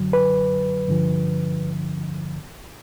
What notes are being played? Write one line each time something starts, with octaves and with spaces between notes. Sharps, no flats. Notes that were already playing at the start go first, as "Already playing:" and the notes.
Already playing: F#2 D3 F#3
B4
G2 D3 F3